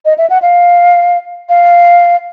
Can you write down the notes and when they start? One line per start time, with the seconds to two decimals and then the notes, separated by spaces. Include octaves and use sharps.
0.05 D#5
0.18 E5
0.30 F#5
0.42 F5
1.49 F5